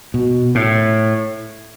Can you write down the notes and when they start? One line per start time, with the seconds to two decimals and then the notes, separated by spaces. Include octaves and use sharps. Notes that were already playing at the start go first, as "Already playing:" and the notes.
0.14 B2
0.55 A2